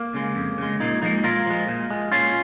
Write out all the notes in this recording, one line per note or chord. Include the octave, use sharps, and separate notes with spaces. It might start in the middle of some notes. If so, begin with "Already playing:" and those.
Already playing: A#3
C#3 G#3
F2
C#3 G#3
A#2 A#3 D#4
F3 G#3 A#3 D#4
A#2 F4 A#4
F3 G#3
A#2
G#3
A#2 C#4 F4